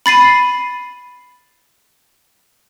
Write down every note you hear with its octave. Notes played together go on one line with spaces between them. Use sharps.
B5 A6 C7 D#7